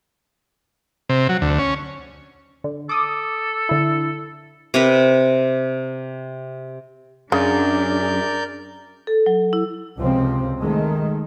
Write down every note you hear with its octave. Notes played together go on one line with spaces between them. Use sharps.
C3
F#3
D2
C#4
D3
A4 D6 D#6
D3 E4
C3 A#4 B4
F#2 C#3 D4 G#4 A#4 D5 G6
A4
F#3
E4
C#2 C3 F3 C4
D#3 G#3 A3